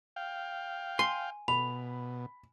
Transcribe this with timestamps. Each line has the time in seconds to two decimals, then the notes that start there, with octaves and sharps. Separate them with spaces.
0.16 F5 G5
0.99 G#5 C6
1.48 B2 B5 F7